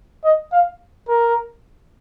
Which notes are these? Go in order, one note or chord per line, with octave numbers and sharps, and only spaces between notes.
D#5
F5
A#4